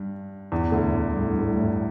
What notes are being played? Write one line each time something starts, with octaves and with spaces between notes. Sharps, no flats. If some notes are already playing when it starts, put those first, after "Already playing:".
Already playing: G2
E2 E3
D2 D3
A2
G2
A2
G2
A2
G2
A2